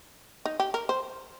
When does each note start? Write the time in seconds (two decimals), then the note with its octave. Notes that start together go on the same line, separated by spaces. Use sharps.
0.46 D#4
0.60 G4
0.74 A#4
0.89 C5